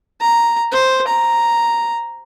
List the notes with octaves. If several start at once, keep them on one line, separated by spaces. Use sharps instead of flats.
A#5
C5
A#5